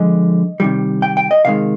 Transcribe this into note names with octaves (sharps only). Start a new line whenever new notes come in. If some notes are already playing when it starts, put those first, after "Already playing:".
Already playing: D3 F3 G#3 D#5
C3 D#3 G3
G5
G5
D#5
C3 D#3 G#3 F5